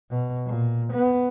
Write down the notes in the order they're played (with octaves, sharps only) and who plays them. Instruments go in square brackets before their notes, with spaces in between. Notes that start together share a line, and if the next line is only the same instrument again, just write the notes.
[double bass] B2
A#2
B3